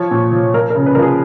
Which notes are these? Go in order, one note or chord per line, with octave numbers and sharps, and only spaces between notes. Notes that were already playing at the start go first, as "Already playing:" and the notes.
Already playing: F3 C#5
A#2
F3
F3 A#4
A#4
C#3
B4
F3 A#4
G#4